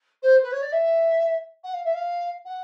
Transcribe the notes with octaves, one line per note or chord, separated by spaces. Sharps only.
C5
B4
C#5
D5
E5
F#5
F5
E5
F5
F#5